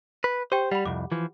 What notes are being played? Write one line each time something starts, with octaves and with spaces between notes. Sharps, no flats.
B4
G4 C5 G5
G3 F#5 B5
C2 F2 D6
E3 F3